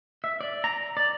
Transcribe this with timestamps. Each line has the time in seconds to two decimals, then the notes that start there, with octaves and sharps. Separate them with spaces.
0.24 E5
0.41 D5
0.64 A#5
0.97 D5